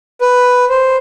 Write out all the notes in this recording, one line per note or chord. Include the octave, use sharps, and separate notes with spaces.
B4
C5